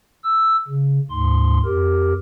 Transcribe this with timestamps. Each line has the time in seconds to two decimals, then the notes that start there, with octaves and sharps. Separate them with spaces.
0.24 E6
0.68 C#3
1.11 D2 G#2 C6
1.65 F2 G4 A#4